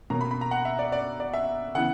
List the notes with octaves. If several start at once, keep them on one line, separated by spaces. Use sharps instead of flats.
B2 A#3 C#4 A#5
B5
B5
A#5
F#5
E5
D5
D5
D5
E5
C#3 E3 B3 F#5